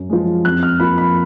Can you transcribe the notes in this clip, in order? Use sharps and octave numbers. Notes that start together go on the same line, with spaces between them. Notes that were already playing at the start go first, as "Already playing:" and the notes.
Already playing: F#2
F3 G#3
F2 F#6
F6
F3 A#3 B5
B5